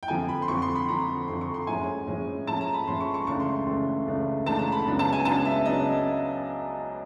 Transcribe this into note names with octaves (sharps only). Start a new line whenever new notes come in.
G5
F2 D3 F3 G#5
B5
C6
F2 D3 F3 C#6
C6
B5
F2 D3 F3 A#5
F2 D3 F3 C6
C#6
C6
A2 F3 G#3 C#4 G#5
A2 F3 G#3 C#4
A2 F3 G#3 C#4 A5
A#5
B5
A2 F3 G#3 C#4 C6
C#6
C#6
C#2 C#3 E3 A3 D4 C#6
C6
C#2 C#3 E3 A3 D4
C#2 C#3 E3 A3 D4
C#2 C#3 E3 A3 D4 A5
A#5
B5
C#2 C#3 F#3 B3 D4
A5
G#5
C#2 C#3 F#3 B3 D4 A5
E5
C#3 F#3 B3 D4 D#5